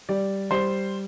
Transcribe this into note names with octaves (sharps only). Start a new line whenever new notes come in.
G3 D5
G3 C5